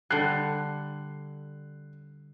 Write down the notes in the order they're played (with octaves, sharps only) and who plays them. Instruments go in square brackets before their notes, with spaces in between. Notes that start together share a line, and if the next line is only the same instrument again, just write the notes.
[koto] D3 G3 [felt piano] F#6 C7